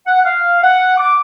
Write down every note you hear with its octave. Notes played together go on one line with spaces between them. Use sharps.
F#5
F5
F#5
D6